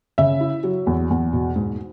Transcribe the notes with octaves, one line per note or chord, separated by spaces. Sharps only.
C#3 E5
E4
F#3
E2
E2
B2
G#2